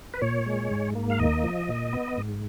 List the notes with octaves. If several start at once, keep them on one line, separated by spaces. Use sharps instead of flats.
B4
A#2 C#5
G#3
G#2
A#3
F5
D#2 D#5
F3
A#2
B3
G#2